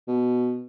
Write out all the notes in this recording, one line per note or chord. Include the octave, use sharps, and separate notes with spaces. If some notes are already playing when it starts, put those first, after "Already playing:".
B2